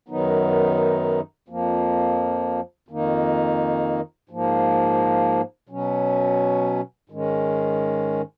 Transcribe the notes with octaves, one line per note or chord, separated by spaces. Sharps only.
F#2 D#3 F#3 B3 D#4
F2 F3 A#3
F2 D#3 A#3 D#4
G#2 F3 A#3
B2 F#3 C#4
G#2 D#3 G#3 C#4